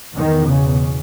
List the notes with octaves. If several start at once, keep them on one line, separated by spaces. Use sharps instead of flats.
E2 B2 D#3
C#3